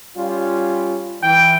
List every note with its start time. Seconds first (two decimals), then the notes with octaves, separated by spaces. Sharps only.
0.16 G3 C#4 F4
1.23 E3 G5